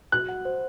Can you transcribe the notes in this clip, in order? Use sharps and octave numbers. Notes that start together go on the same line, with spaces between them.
F#4 F#6
F#5
C5